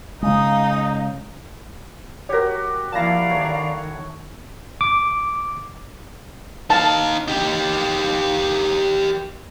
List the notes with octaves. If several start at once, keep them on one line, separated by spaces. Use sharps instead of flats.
C#3 G#3 D#4 F5 D#6
F#4 G4 A#4 C#5
F3 A#3 E4 D5 F5 A5 A#5 A#6
D#3 A3 C#5 G#5
D6
D#4 F5 A5
D#4 G4